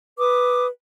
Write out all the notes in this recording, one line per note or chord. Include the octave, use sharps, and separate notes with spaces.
B4 D6 D#6